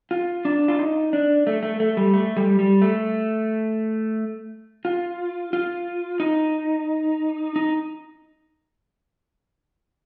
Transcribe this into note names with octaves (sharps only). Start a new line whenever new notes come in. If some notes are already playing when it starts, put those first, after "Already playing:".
F4
D4
F4
D#4
D4
A3
A3
A3
G3
A3
G3
G3
A3
F4
F4
D#4
D#4